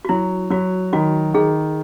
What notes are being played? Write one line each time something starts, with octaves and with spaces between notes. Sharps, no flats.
F#4
F#3 E4
F#3 F#4
D#3 F#4
D#3 G#4